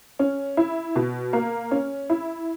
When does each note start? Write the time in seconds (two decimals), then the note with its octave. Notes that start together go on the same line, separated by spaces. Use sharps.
0.19 C#4
0.57 E4
0.95 B2
1.33 A#3
1.71 C#4
2.10 E4